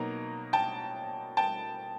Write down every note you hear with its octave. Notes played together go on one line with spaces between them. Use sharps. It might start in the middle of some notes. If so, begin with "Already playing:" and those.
Already playing: B2 F#3 A#3 D#4 A#5
G5 A5
G5 A5